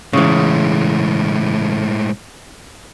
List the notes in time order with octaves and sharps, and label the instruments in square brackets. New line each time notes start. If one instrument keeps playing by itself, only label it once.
[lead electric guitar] A2 G#3 [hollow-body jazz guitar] C#3 E3